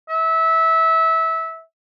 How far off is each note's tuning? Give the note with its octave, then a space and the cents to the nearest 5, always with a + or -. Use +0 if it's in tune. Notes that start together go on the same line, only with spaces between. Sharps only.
E5 -20